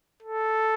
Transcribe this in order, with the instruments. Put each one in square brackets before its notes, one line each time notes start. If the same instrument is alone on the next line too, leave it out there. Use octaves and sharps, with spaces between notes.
[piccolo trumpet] A4